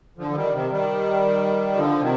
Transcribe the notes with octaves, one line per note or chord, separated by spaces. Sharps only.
D3 F3
F3
D#3 G3
C3 D#3
D#3 G3
D3 F3
C3 D#3